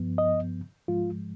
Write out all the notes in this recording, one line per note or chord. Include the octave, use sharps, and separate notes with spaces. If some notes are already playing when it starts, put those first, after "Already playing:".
Already playing: G2 F3 B3
D#5
G#2 F3 G#3 F4